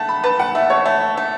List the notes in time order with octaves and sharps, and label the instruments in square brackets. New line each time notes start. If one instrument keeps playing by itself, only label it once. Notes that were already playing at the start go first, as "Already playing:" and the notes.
Already playing: [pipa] A3 [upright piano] F#5 A5
[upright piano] B5
[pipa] B4 [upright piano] A5
[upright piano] F#5
[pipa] A3 [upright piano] E5
[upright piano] C#5
[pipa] A3
A3